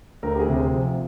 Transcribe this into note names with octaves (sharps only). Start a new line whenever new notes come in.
D2 A#4
G4
G#4
C3
C5
F3